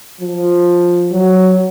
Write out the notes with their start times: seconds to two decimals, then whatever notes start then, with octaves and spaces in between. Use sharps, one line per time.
0.21 F3
1.11 F#3